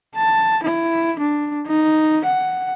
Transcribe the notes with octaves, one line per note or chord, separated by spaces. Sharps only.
A5
E4
D4
D#4
F#5